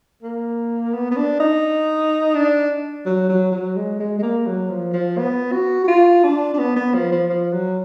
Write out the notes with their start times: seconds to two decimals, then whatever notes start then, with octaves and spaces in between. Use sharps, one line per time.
0.23 A#3
0.94 B3
1.11 B3
1.17 D4
1.40 D#4
2.35 D4
3.06 F#3
3.29 F#3
3.52 F#3
3.77 G#3
4.00 G#3
4.19 G#3
4.23 A#3
4.47 F#3
4.70 F3
4.94 F3
5.18 B3
5.52 F#4
5.84 F#4
5.88 F4
6.24 D4
6.54 D4
6.59 B3
6.76 B3
6.95 F3
7.12 F3
7.30 F3
7.53 F#3